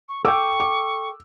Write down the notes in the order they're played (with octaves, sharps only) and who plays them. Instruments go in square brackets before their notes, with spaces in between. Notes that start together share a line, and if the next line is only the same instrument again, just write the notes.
[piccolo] C#6
[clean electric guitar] A4 G5 [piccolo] C#6 [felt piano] D6 E6
[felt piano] D6